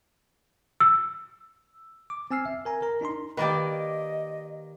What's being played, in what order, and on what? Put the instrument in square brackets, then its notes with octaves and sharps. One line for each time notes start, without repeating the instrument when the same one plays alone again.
[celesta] E6
[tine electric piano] D6
C4 G#5 E6 F6 C7
E5
A#4 G#5 A#5
A#4 A#5
D4 D#4 A#5 C6
[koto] D#3 A#3 D5 [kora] G4 B4 [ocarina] D#5